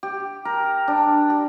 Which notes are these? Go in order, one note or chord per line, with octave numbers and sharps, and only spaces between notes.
G4
A#4
D4
G4